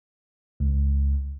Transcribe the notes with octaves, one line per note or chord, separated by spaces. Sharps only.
C#2